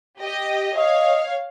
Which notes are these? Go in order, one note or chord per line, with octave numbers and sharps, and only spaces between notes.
G4 D#5
C#5 D#5 F5